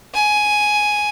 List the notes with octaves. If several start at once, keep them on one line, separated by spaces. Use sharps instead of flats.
G#5